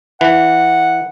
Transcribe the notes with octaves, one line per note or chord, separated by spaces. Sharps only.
E3 F#5